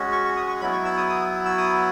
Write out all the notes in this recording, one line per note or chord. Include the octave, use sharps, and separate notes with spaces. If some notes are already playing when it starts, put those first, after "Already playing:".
Already playing: G#3 C#4 F#4
C#6
C#6
D#6
C#6
F#3 B3 E4 B5
C#6
E6
D#6
D#6
E6
D#6